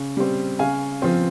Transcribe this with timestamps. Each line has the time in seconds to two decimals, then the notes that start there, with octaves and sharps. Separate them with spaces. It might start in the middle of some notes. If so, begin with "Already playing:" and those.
Already playing: C#3
0.17 G3 C4
0.59 C#3 F5 G#5
1.02 F3 C4